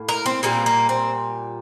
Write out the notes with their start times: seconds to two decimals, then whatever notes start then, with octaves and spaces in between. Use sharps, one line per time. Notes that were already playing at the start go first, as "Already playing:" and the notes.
Already playing: A2 A#3
0.09 A#4
0.26 C4
0.43 A#2 G3 A#3 C4
0.66 A#3
0.89 C4